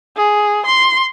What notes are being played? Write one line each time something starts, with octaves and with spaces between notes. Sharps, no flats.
G#4
C6